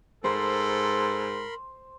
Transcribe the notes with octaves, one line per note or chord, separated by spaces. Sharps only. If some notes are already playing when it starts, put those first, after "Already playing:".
G#2 A4 A#4 C5 B5 C6